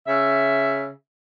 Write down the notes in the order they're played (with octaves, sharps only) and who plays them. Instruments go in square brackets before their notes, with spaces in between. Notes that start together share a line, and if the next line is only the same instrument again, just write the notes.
[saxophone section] C#3 E5